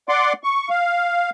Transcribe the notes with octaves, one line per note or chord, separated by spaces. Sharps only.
D5 F#5 C6 D6
C#6
F5